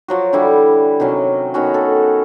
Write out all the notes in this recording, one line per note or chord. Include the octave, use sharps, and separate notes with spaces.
F3 F#3 F#4
D3 E3 G3 E4
C3 D#3 F#3 C#4
D#3 B3 C#4 F#4
A4